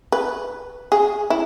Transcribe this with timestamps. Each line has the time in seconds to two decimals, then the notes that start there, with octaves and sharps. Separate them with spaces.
0.12 B4
0.92 G#4
1.30 E4